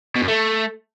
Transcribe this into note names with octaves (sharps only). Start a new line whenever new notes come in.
B2
F#2
A3